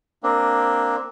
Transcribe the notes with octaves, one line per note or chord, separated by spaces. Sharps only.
A#3 C4 D4